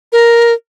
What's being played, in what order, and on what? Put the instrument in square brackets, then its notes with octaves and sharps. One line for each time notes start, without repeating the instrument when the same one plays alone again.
[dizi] A#4